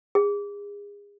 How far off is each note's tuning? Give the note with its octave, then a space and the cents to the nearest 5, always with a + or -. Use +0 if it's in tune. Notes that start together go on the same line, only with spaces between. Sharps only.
G#4 -30